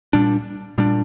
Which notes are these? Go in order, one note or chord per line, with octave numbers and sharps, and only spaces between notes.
A#2 G3 D4
A#2 G3 D4